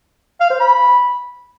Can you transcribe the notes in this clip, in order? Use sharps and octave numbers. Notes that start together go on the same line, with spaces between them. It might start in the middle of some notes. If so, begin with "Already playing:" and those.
F5
C5
B5